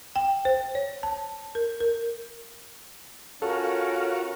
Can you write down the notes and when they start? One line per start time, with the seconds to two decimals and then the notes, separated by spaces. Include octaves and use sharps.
0.16 G5
0.45 C5
0.75 C#5
1.03 A5
1.55 A#4
1.80 A#4
3.42 C#4 F4 F#4 A4 A#4 C#5